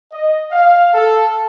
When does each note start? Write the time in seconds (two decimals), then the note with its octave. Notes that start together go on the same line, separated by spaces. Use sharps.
0.13 D#5
0.52 F5
0.94 A4